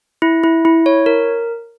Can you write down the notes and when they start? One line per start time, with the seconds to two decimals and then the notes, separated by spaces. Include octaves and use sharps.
0.22 E4
0.44 E4
0.65 E4
0.86 C#5
1.06 A#4